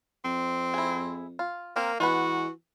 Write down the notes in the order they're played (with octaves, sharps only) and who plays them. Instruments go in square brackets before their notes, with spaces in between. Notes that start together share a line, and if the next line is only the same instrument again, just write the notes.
[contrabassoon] F2 [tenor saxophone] C4
[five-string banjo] E4 G#4
F4
[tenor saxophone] A#3 [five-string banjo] C4 A#4
[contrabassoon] E3 [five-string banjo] G#3 B3 B4 [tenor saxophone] F#4